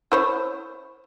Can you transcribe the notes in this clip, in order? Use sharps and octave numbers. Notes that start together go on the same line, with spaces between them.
E4 C5 C#5